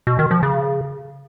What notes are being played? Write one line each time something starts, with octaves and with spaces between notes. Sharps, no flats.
B2
D#3
F3
C#3